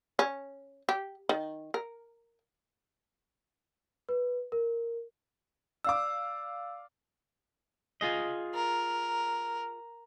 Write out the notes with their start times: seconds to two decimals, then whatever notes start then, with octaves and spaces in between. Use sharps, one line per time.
0.19 C#4
0.89 G4
1.29 D#3
1.74 A#4
4.09 B4
4.52 A#4
5.84 D5 F5 D6 E6
8.01 F4 G#4 D#5
8.55 A#4